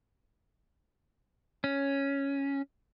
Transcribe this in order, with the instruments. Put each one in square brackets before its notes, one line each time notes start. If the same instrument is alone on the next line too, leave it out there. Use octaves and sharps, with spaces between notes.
[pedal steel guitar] C#4